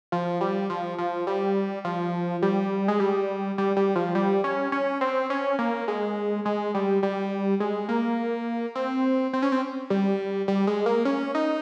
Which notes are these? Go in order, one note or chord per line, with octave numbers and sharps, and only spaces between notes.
F3
G3
F3
F3
G3
F3
G3
G#3
G3
G3
G3
F3
G3
C#4
C#4
C4
C#4
A#3
G#3
G#3
G3
G3
G#3
A#3
C4
C4
C#4
C4
G3
G3
G#3
A#3
C#4
D#4